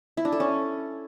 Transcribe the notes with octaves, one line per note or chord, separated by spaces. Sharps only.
E4
D4
A4
C#4